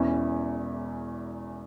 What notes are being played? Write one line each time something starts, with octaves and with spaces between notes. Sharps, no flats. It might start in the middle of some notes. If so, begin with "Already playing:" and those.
Already playing: E1 E2 E3 C#4